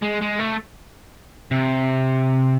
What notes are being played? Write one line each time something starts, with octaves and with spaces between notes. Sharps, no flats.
G#3
G#3
A3
C3